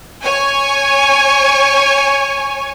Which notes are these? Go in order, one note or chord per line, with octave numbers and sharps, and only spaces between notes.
C#5 G#5 C#6